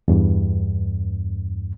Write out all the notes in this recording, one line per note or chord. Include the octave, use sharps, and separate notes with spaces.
E2 G2